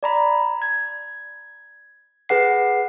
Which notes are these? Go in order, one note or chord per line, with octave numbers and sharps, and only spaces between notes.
D5 A#5 B5
G#6
G#4 B4 F#5 C7